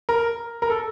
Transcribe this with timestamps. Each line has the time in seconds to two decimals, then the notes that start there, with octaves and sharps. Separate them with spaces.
0.09 A#4
0.62 A#4
0.70 A4